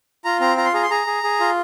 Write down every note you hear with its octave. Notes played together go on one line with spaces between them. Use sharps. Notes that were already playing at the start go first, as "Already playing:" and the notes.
F4 A#5
C4 A#5
F4 A#5
C6
G#4 A#5
C6
G#4 A#5
G#4
G#4
F4